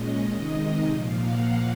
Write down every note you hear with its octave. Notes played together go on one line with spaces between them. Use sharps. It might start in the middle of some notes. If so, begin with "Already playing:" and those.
Already playing: A#2 G#3 C#4 D#5
C3 D#3 G#3 D#4
A#2 F3 A#3 F5
F#5